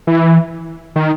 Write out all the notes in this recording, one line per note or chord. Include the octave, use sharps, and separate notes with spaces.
E3
D#3